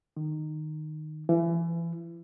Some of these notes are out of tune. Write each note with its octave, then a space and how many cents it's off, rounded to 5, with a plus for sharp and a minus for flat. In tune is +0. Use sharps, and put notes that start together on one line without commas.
D#3 -15
E3 +30